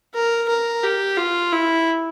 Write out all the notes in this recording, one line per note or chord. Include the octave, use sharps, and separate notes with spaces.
A#4
A#4
G4
F4
E4